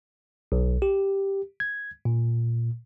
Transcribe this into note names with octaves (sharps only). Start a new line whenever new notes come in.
B1
G4
G#6
A#2